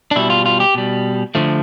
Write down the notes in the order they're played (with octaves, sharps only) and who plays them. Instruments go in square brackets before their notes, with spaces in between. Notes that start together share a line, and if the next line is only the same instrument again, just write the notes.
[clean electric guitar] D4
B2 G3 E4
F4
F4
G4
B2 G3
D3 F3 A3